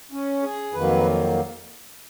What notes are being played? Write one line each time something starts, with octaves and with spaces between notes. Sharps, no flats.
C#4
G#4
F2 D#3 F#3 A#3 B4